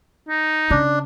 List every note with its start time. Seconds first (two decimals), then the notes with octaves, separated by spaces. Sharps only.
0.29 D#4
0.71 C#3 D4